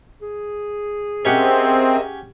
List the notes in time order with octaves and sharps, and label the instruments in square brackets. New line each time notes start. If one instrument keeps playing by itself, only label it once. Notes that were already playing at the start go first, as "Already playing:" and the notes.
[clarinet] G#4
[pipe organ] C4 [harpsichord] C#4 G4 F#5 [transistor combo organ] A#4 D#5 E5